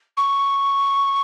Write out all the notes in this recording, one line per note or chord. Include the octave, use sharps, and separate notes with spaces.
C#6